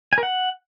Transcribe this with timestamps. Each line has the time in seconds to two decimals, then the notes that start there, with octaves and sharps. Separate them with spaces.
0.13 G#5
0.18 A#4
0.23 F#5